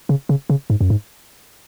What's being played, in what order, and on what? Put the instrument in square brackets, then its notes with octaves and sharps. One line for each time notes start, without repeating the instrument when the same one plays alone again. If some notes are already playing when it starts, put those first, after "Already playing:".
[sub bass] C#3
C#3
C#3
G#2
F#2
G#2